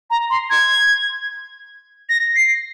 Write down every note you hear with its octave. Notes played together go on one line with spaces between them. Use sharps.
A#5
C6
G#6
A#6
C7